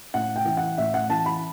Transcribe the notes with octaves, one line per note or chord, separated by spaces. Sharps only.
A2 F#5
G5
E3
F#5
A2 E5
F#5
E3 A5
B5